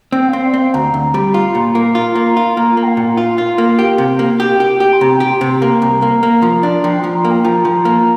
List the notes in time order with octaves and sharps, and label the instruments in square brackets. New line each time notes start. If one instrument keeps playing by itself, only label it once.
[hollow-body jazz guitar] C4 [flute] G5
[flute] F5
[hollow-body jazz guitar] C4
[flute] D5
[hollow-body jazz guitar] C4 [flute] F5
[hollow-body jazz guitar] D2 [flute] A#5
[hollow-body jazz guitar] D2
G3
F4
A#2
A#3
[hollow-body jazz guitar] F4 [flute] C6
[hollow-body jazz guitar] A#3
[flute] A#5
[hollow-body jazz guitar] F4
[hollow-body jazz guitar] A#3 [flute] A#5
[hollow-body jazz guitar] A#3
[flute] G5
F5
[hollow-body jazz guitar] A#2
F4
F4
A#3
G4
C3
A#3
[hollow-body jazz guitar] G4 [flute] G5
[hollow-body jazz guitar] G4
G4
[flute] C6
[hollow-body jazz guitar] C3 [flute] A#5
[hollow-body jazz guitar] G4 [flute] G5
[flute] C6
[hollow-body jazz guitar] C3
[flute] C6
[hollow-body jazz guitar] A#3 [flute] A#5
[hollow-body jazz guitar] C2
A#3
A#3
F3
D4
[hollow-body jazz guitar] F3 [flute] G5
[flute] C6
[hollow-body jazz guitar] F3
[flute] A#5
[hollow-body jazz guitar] A#3
[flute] G5
[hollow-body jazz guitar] F3 [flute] A#5
[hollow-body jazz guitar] F3
A#3